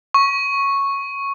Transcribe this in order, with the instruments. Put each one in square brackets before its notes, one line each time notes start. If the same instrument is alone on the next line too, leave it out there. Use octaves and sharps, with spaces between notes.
[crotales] C#6